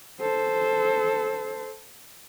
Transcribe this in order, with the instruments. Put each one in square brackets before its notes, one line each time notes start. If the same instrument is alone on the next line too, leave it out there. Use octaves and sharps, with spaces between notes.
[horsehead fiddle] A4 C5